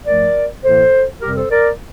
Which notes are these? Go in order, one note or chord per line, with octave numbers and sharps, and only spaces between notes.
G2 F3 A3 A#4 D5
A2 E3 A#3 A4 C5
F2 C3 G3 C4 G4 A#4
A4 C5
A#4 D5